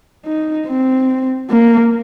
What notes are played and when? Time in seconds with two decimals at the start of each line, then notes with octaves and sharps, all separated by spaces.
0.26 D#4
0.68 C4
1.50 A#3